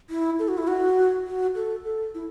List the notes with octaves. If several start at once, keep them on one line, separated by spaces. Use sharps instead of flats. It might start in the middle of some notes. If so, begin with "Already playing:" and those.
E4
A4
F#4
E4
F#4
F#4
A4
A4
E4